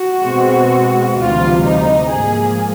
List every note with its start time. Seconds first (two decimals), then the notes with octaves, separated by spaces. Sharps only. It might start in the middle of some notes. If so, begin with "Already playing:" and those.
Already playing: F#4
0.24 B2 G#3 C4
1.17 D2 C3 E3 G3 F4
1.64 D#4
2.10 G#2 F3 A#3 G#4